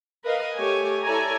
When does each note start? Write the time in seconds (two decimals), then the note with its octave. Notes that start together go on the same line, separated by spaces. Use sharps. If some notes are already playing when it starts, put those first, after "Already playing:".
0.24 A#4 B4 D#5 F5
0.56 A3 G4 C#5 G#5
1.03 E4 A4 C#5 D5 G#5 A#5